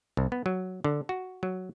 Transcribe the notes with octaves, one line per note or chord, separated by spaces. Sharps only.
C2
B3
F#3
D3
F#4
F#3